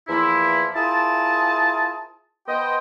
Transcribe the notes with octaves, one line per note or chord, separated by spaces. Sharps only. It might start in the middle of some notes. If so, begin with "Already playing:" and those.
E2 E3 F3 A#3 E4
E4 F4 G#4 A#4 C5 A5
B3 C5 D#5 G5